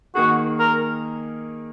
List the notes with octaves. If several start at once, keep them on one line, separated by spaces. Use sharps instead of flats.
D#3 A#3 D#4 F#4 G#4
A#4